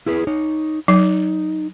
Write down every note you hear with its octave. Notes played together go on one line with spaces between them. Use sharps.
E4 G#4 B4
D#4 C#5
F#3 D#4